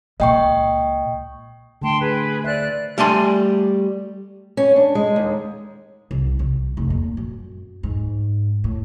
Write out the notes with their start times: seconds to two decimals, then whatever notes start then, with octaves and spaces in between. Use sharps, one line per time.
0.20 C#2 A#2 D#5 G5 C#6
1.82 D3 A3 G5 A5 C6
2.00 G#4 B4
2.44 C5 D5 E5 F#6
2.98 G3 A3 D5 G#5 C6
4.57 C#4
4.76 D4
4.95 G#3
5.16 D#2
6.11 C2
6.39 C2
6.77 F1
6.90 A#2
7.17 F#2
7.83 G#2
8.64 A2